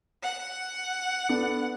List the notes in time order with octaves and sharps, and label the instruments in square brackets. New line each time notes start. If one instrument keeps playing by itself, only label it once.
[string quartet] F#5
[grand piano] B3 D4 A4